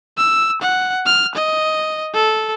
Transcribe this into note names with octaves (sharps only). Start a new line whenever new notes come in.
E6
F#5
F6
D#5
A4